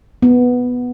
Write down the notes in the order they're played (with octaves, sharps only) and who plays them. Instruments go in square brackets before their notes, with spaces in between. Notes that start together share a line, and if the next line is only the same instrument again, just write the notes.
[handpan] B3